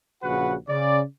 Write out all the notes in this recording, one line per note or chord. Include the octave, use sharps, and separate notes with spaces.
A#1 C#3 F#4 B4 F#5
C#3 D5